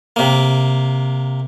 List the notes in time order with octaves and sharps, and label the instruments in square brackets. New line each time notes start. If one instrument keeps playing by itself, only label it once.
[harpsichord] C3 A#3